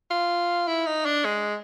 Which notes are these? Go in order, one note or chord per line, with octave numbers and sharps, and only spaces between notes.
F4
E4
D#4
D4
G#3